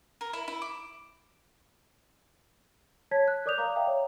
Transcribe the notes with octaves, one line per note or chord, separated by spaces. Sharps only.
A#4
E4
E4
D6
C#5 A5 G#6 B6
F#6
A#4 D5 D6 D#6 G6 F7
A#4 D5 F5 A#5 D6
E5 F5 G5 A#5
C#5